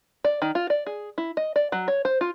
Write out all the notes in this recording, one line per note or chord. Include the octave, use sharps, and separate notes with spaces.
D5
D#3
F4
D5
G#4
E4
D#5
D5
F#3
C#5
C5
F4